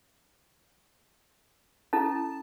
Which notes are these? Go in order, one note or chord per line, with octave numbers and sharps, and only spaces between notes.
C#4 E4 A4 A5